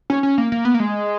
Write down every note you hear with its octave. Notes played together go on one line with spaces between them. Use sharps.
C#4
C#4
A#3
A#3
B3
A#3
G#3